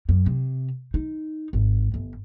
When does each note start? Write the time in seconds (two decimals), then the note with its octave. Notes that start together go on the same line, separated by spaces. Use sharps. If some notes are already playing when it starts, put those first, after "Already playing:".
0.09 F#2
0.26 C3
0.94 D#4
1.53 G#1
1.94 G1